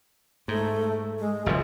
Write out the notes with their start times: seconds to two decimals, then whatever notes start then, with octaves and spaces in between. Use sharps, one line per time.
0.48 G#2 A3
1.19 G#3
1.46 F#1 C#3 F3 C4